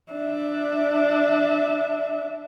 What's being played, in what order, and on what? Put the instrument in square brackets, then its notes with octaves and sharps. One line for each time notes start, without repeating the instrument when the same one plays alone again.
[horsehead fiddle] D4 E5